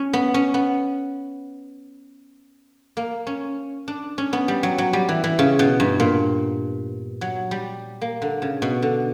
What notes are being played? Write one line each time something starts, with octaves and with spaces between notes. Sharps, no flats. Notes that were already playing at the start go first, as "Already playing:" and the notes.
Already playing: C#4
B3
C#4
B3
A#3
C#4
D4
C#4
B3
G3
F#3
F#3
G3
E3
E3
C#3
B2
G2
A#2
F#3
G3
A#3
D3
C#3
B2
D3